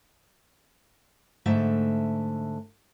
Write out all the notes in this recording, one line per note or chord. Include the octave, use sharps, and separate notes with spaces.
G#2 D3 A3 E5